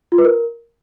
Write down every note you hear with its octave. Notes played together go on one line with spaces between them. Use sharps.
F4
B4
A#4